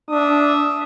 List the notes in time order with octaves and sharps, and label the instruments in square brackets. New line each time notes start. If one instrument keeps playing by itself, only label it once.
[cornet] D4 [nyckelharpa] E5 D#6